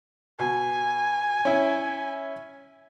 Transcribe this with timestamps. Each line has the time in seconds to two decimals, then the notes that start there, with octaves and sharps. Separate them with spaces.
0.39 B2 G#5
1.45 C#4 E4